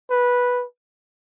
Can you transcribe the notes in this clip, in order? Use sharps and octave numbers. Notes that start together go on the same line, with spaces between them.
B4